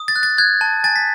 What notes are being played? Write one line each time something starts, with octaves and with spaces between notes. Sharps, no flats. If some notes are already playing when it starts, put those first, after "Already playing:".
Already playing: D#6
A6
F#6
A6
F#6 G#6
A5
G#5 A6
B6